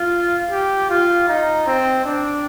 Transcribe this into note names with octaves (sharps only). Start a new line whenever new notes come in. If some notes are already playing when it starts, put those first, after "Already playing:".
Already playing: F4
G4
F4
D#4
C4
D4